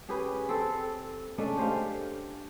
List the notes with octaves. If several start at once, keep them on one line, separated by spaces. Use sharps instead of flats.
C#4 G4 G#4 B4
C4 A4
G#3 A3 C#4 D4
G4 C5 F5